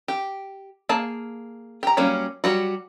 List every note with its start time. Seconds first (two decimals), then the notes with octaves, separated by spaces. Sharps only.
0.08 G4
0.89 A#3 G#4 A5
1.83 G4 A#5
1.97 F#3 G3 A#3 C#4
2.44 F#3 G3 F#4